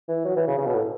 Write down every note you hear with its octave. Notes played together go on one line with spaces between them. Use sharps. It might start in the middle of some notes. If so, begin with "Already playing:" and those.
E3
F#3
E3
C#3
C#3
B2
A2